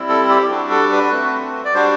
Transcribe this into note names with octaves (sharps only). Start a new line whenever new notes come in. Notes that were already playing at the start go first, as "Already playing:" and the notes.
Already playing: G3 C4 E4
A4
G4
G3 D4 F#4
A4
B4
A3 C4 F#4
D5
G3 D4 F#4 C5